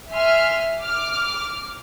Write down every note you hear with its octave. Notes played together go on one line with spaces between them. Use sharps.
E5 G#5 C6 F6
D6 F6